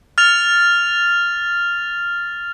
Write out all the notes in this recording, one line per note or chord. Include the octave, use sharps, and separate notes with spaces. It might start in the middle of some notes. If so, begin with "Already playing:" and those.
F6 A6 F7